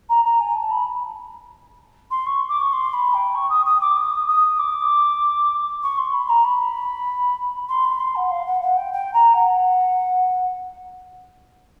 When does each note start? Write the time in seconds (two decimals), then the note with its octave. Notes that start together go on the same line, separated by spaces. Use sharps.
0.09 A#5
0.24 A#5
0.40 G#5
0.55 A5
0.70 B5
2.10 C6
2.26 C#6
2.48 D6
2.61 C#6
2.72 C6
2.93 B5
3.14 G5
3.35 C#6
3.50 D#6
3.66 D#6
3.81 D6
3.96 D#6
4.27 D#6
4.59 D6
5.83 C#6
5.98 C6
6.13 B5
6.29 A#5
6.44 B5
7.68 C6
7.84 B5
7.99 C6
8.15 F#5
8.31 F5
8.46 F#5
8.62 F#5
8.77 G5
8.93 G5
9.13 A#5
9.34 F#5